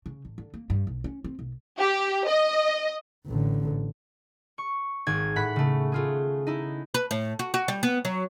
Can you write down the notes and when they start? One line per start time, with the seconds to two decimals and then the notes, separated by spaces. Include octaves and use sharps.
0.06 C#3
0.25 A1
0.38 D3
0.54 A#3
0.70 G2
0.87 B1
1.04 C#4
1.24 C4
1.39 B1
1.78 G4
2.27 D#5
3.26 A1 D3
4.58 C#6
5.07 G#1 G#6
5.36 A2 F#5 B5 F#6 B6
5.56 C#3 A3
5.92 A3 F4 G#4
6.47 D#4 E4
6.94 B4
7.11 A2
7.39 F#4
7.54 F#4
7.68 G3
7.83 B3
8.05 F#3